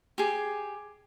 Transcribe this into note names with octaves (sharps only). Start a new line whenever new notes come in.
G4 G#4